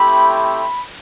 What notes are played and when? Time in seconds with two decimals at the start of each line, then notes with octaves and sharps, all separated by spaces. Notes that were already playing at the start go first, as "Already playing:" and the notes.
Already playing: A3 C4 E4 G4 B5
0.34 B5